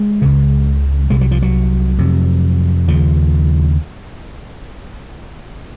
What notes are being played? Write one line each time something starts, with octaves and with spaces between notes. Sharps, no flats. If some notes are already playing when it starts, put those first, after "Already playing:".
Already playing: G#3
C#2 C#3
C2 C3 G#3
F#3
F3
F#3
F2 C3
D#2 C#3 F3